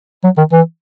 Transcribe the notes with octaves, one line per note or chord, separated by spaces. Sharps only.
F#3
D#3
E3